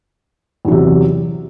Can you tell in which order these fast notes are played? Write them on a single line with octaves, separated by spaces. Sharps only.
E2 F#3 C3